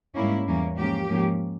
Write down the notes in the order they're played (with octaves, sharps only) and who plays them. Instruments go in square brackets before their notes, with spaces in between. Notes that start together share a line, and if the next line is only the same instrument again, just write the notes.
[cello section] G#2 G3 A#3 C#4 E4
E2 E3 G3 A#3 C#4
G#2 F3 A#3 C#4 G4
G#2 F3 A#3 C#4